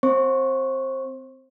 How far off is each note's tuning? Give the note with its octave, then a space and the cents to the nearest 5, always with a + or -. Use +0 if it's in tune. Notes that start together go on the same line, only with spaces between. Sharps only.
C4 -10 C5 +30 C#6 +0